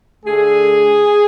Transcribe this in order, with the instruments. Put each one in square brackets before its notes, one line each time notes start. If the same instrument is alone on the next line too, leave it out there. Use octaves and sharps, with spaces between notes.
[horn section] D3 A3 G#4